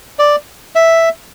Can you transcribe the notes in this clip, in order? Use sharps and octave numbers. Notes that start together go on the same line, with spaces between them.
D5
E5